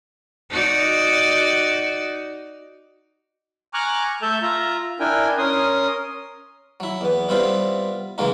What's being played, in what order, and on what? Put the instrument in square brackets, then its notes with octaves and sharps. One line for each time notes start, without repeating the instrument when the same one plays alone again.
[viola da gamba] D#4 F#4 D5
[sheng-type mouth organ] G#5 A#5 C#6 D6 F6 F#6
A3 A4 E5 A5 G6
F4 E5 A#5
D4 E4 A#4 G5 G#5
C#4 A#4 C6 D#6
[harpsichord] F#3 E4
E2 B3
G3 B3 C4 E4 F4
C#3 E3 F#3 G#3 A#3 D#4